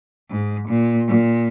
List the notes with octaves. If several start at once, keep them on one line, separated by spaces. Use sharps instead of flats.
G#2
A#2
A#2